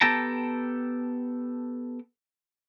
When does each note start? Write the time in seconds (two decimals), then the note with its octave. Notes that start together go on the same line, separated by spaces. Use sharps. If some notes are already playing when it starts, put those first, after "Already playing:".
0.01 B3 G4 A4 G5 A5 A#5